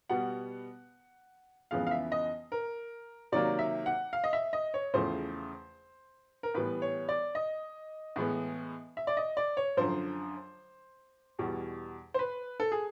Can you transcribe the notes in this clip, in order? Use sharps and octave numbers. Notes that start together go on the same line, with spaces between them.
B2 G3 B3 F#5
F2 C#3 E3 G#3 B3 F5
F5
E5
D#5
A#4
C3 D#3 F#3 A#3 D5
E5
F#5
F5
D#5
E5
D#5
C#5
E2 C#3 F3 A3 C5
A#4
A2 E3 G3 B3 B4
C#5
D5
D#5
A2 E3 G#3 B3
E5
D5
D#5
D5
C#5
F#2 D3 F3 C5
E2 B2 G3
C5
B4
A4
G#4